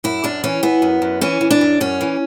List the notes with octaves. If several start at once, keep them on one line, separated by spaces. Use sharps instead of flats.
F#2 E4
F#2 D4
E3 C#4
E3 B3
F#2
F#2
E3 C#4
E3
D4
F#2
F#2 C#4
E3